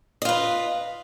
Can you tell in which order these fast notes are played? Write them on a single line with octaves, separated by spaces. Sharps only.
D#5 F4 B4